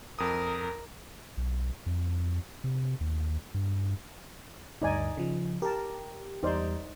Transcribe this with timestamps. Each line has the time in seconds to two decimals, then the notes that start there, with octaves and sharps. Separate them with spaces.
0.19 F2 A#4 D#6
1.37 B1
1.86 F2
2.64 C3
3.01 D#2
3.54 G2
4.82 D2 G2 D#4 D5 G#5
5.17 C#3 F3
5.62 G4 A#4 A5
6.43 E2 G3 D#4 C5 D5